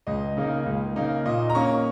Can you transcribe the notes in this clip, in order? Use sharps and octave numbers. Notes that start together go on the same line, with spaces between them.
C#2 D#5
C#3 A#3 D#4
C#2
C#3 A#3 D#4
A#2 D#5
A#5
A#3 C#4 C#6